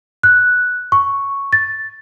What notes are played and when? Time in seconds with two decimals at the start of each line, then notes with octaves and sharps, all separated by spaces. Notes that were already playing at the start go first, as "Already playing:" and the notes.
0.23 F#6
0.92 C#6
1.53 A6